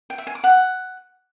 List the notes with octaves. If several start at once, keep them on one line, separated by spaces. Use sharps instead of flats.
G5
E5
G#5
D6
F#5